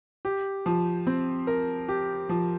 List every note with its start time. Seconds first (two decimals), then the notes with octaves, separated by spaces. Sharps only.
0.25 G4
0.66 F3
1.07 C4
1.47 A#4
1.89 G4
2.29 F3